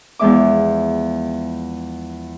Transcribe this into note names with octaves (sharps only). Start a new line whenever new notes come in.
E2 F3 G#3 E5 D6